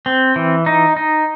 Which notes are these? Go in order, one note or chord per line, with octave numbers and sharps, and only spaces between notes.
C4
E3
D#4
D#4